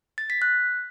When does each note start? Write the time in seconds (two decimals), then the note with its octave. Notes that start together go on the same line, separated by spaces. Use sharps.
0.18 A6
0.30 B6
0.42 F#6